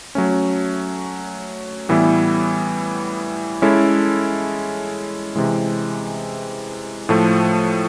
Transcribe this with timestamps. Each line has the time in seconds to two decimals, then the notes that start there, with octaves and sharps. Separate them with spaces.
0.15 F#3 A3 C#4
1.89 A2 E3 G3 B3 E4
3.62 G#3 C#4 E4 A4
5.36 C3 E3 G#3
7.09 A2 F3 A3